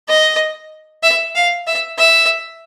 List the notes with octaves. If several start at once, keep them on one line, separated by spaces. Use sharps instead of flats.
D#5
E5
F5
E5
E5